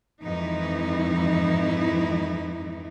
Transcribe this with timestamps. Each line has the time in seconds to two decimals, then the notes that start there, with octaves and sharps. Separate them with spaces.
0.23 F2 G#2 E3 D#4 E4